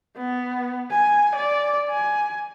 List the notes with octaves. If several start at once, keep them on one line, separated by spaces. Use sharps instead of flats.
B3
G#5
D5
G#5